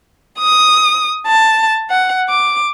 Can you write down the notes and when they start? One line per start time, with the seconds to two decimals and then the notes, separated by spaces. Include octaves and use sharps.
0.39 D#6
1.27 A5
1.90 F#5
2.28 D6